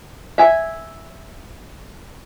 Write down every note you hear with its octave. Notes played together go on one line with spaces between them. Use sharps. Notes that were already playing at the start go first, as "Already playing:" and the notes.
E5 G#5